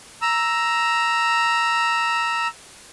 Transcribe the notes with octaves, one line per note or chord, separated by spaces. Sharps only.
A#5 E6